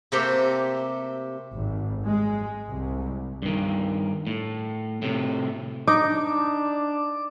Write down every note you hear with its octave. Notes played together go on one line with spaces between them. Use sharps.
C3 A3 A#3 C4 G4
G#1
G#3
C2
G2 D#3
A2
A2 C3
D4 D#4 D6